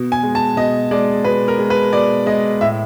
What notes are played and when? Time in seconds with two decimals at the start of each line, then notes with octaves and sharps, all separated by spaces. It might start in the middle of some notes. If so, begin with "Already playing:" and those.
Already playing: B2
0.12 G#5
0.23 G#3
0.35 A5
0.57 B2 D#5
0.91 G#3 D5
1.24 B2 B4
1.48 A#4
1.59 G#3
1.70 B4
1.93 B2 D5
2.26 G#3 D#5
2.61 A2 E5